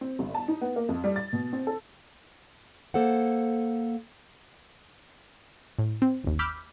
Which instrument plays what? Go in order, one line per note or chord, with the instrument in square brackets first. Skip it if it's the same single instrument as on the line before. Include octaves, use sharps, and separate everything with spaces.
[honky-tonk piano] C4
G1
A5
D#4
B3
A#3
F2
G3
A6
B2
C4
A4
[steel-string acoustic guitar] A#3 A4 C5 F#5
[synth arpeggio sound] A2
C4
G1 D#2
B5 D6 E6 F6 G6 B6